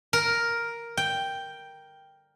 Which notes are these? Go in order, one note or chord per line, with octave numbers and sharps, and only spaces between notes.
A#4
G5